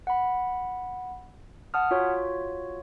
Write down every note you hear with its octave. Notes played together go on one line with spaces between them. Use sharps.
F#5 B5
F#5 A5 D#6 F6
F4 F#4 C#5